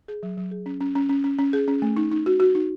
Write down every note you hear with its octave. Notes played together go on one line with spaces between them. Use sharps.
G#4
F#3
F#3
G#4
C#4
C#4
C#4
C#4
C#4
C#4
G#4
C#4
A3
D#4
D#4
F#4
F#4
D#4